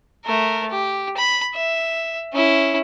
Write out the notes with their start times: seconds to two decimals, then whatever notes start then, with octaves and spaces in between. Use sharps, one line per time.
0.25 A3 A#4
0.71 G4
1.17 B5
1.55 E5
2.33 C#4 E4